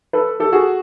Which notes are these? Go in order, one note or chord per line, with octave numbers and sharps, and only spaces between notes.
A4 B4
G4 A4
F#4 G#4